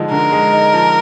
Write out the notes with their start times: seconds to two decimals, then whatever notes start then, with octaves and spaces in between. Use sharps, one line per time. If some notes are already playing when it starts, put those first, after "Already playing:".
Already playing: D3 F3 G#3 D#4
0.11 D3 A#4
0.32 G#3
0.53 D#4
0.74 F3